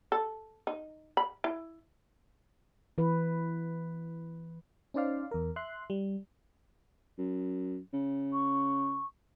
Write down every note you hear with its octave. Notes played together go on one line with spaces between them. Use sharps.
A4
D#4
B5
E4
E3 B4
C#4 D#4 C5 D5 F5
E2 A#4
E5 C6 F#6
G3
F#2
C#3
C#6